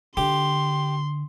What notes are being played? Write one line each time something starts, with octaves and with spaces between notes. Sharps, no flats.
D3 G4 C6